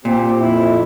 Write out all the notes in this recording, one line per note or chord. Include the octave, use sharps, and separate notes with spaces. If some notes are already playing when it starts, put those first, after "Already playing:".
A#2 C4 G4
F2 E4